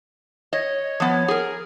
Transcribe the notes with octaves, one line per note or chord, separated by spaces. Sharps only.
C#5 D#5
F3 B3
G#4 A#4